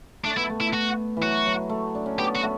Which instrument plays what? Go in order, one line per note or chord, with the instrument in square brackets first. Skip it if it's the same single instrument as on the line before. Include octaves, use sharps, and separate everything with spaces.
[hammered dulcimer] A3 [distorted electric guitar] D4
[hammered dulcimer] B3 [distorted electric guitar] E4
[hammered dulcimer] A3
[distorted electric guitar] E4
F#4
[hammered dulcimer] E3
[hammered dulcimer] F#3 [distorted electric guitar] F#4
[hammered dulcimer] F#3
A3
D4
C#4
[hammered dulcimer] B3 [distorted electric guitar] G4
[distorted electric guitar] F#4
[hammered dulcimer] A3